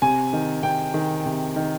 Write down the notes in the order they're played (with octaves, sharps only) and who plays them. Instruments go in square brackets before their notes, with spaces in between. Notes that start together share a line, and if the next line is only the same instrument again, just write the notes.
[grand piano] C3 G#5
D#3
C3 G5
D#3
C3
D#3